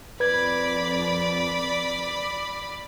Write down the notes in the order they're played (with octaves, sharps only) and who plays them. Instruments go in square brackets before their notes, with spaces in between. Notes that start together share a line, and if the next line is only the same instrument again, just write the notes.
[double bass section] F2 [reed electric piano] B4 G#6 [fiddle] D5 B5